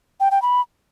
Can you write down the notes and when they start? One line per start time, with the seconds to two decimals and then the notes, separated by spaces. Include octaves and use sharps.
0.20 G5
0.31 G5
0.42 B5